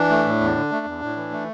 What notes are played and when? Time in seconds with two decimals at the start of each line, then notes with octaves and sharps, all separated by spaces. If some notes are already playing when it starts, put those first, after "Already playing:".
Already playing: E3 D4
0.10 A3
0.25 A2
0.40 E2
0.55 D3
0.71 A3
0.86 E2
1.02 A2
1.16 E3
1.32 A3